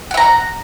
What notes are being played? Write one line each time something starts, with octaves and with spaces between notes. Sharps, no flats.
E5 F#5 A#5